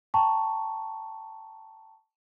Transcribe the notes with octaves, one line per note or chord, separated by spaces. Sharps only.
G5 A5 A#5 C#6